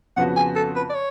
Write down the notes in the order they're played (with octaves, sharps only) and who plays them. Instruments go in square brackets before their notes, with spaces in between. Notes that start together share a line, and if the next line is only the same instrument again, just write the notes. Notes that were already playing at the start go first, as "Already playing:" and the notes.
[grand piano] F2 C#3 F3 B3 F#4 [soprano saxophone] F#5
[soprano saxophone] G#5
A4
B4
D5
C#5